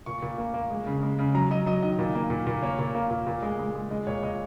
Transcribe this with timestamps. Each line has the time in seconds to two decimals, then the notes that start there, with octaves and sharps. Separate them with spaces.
0.06 A#2 C#6
0.23 A#2
0.38 A#3
0.54 A#3
0.70 G#3
0.86 C#3
1.03 G#3
1.19 C#3
1.34 F#3 A#5
1.51 F#3 D#5
1.66 F#3 D#5
1.83 D#3 D#5
1.99 A#2
2.15 A#3
2.30 A#2
2.47 A#2
2.63 A#3 C#5
2.79 A#2
2.95 A#3
3.10 A#2
3.27 A#2
3.42 G#3
3.59 G#3
3.75 G#3
3.90 G#3 D#5
4.07 A#2 C#5
4.23 A#2 D#5